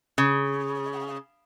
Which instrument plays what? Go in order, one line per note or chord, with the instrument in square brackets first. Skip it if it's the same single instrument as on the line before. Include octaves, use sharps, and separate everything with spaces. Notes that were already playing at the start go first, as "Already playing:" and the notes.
[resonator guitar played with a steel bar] C#3